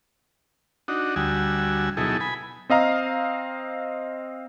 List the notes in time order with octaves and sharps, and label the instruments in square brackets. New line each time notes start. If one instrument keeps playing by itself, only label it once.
[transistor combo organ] D4 D#4 F#4
D2 G3 F#4 G#5 E6
B2 F#3 D#4 E4 G#4 A4
G#5 B5
[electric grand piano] C4 D#5 F5 A#5